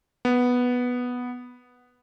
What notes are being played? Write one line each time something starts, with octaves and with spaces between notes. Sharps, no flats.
B3